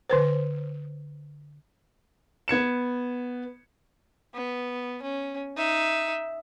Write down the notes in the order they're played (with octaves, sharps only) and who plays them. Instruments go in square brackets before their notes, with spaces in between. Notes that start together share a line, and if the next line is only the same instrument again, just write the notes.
[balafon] D3 B4 C5
[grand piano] B3 G#6 C#7 E7
[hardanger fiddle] B3
C#4
D#4 E5